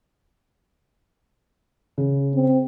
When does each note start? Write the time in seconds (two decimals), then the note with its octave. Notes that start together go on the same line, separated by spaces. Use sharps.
1.98 C#3
2.34 C4